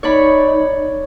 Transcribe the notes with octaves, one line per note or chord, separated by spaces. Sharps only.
D#4 C#5 D5 B5